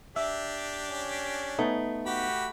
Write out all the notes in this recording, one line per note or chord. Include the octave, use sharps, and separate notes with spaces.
D4 G4 E5
C#4
A3 B3 D#4
F#4 G4 B5